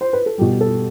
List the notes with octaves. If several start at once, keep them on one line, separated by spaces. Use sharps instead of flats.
C5
B4
A4
B2 G3 G4
A4